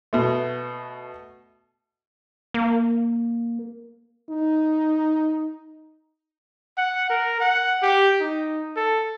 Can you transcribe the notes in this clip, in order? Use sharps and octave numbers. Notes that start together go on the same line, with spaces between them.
B2 A3
A#3
D#4
F#5
A#4
F#5
G4
D#4
A4